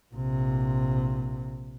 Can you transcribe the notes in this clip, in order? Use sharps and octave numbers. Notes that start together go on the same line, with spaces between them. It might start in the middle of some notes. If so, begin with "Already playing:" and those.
A#1 C3